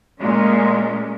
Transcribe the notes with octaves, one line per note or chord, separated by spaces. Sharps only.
A#2 G#3 A3 C#4